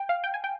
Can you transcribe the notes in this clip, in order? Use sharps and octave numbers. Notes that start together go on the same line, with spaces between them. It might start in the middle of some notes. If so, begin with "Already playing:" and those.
Already playing: G5
F5
G5
G#5
G5